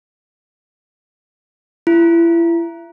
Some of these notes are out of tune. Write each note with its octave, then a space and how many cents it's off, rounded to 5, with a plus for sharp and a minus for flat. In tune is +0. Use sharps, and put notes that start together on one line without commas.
E4 +30